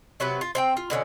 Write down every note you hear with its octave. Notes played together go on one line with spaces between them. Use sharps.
C3 F#3 B3 B4
F4
C4 F5 G5
F4
B2 D3 A#3 C#4